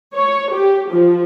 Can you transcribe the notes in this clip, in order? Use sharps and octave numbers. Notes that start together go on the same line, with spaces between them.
C#5
G4
F3